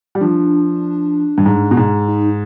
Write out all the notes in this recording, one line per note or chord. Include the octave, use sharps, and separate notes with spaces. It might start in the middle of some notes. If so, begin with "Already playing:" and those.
G3
F3 D4
G2
G#2
B2
G#2
D#4